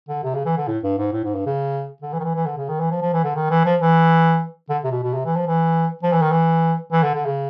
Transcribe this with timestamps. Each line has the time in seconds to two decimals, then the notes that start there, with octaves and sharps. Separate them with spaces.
0.09 D3
0.24 C3
0.34 C#3
0.46 E3
0.57 D3
0.68 A2
0.83 G2
0.98 G#2
1.13 A2
1.24 G#2
1.35 G2
1.46 C#3
2.02 D3
2.13 E3
2.19 D#3
2.24 E3
2.35 E3
2.46 D3
2.58 C#3
2.69 D#3
2.80 E3
2.91 F3
3.02 F3
3.13 E3
3.24 D3
3.35 D#3
3.50 E3
3.65 F3
3.81 E3
4.69 D3
4.84 C3
4.92 B2
5.03 B2
5.14 C3
5.25 E3
5.36 F3
5.47 E3
6.03 F3
6.12 E3
6.22 D#3
6.31 E3
6.92 E3
7.03 D3
7.14 D3
7.25 C#3